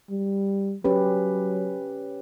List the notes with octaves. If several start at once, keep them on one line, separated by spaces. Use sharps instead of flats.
G3
F#3 C#4 G4 B4